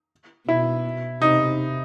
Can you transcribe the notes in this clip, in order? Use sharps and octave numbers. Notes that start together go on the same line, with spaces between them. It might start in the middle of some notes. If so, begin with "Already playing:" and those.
B2 E4
C3 D#4